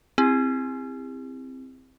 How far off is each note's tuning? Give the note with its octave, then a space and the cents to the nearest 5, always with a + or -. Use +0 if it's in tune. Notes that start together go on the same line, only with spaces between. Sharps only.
C4 +0 E4 +0 G4 +45